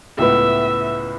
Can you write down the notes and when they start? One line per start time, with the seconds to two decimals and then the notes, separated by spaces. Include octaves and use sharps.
0.19 C#2 A2 B3 E5